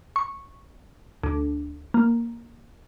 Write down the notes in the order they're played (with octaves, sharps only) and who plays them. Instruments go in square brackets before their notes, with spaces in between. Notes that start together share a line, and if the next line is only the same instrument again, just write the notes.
[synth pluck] C#6
D2
A#3